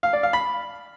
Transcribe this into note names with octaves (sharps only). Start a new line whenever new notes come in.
F5
D5
F5
B5